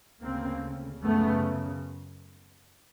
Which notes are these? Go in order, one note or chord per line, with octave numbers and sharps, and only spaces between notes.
D2 C#3 A#3 C4
F#2 C#3 A3 B3